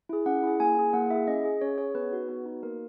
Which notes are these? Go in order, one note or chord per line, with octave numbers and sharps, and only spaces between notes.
E4 G#4
C#4 F#5
E4 G#4
A#3 G#5
E4 G#4
A#3 F#5
E4 G#4 E5
C#4 D#5
G#4
C#4 C#5
G#4 C#5
B3 B4
D#4 F#4
B3 B4
D#4 F#4
A#3 A#4